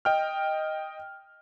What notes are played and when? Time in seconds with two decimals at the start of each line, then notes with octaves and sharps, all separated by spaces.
0.05 D#5 G5 F6